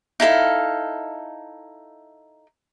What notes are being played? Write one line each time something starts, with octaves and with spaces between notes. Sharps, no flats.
D#4 E4 A4 F5